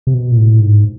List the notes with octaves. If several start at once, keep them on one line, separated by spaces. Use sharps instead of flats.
C3
B2
A#2
A2
G#2